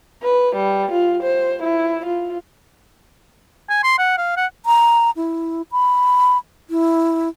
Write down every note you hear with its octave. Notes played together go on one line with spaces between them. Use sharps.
B4
G3
F4
C5
E4
F4
G#5
C6
F#5
F5
F#5
A#5
E4
B5
E4